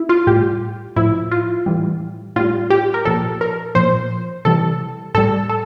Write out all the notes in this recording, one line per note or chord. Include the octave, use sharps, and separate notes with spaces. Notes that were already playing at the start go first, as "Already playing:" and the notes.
Already playing: E4
F4
A2 G3 G4
A2 F3 E4
F4
A2 E3 G3
A2 G3 F4
G4
A#4
A#2 F3 A4
A#4
A#2 F3 C5
C3 E3 G3 A4
A2 G3 A4
A4